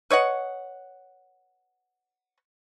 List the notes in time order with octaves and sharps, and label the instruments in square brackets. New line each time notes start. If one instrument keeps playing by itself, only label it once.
[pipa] B4 C#5 D#5 F#5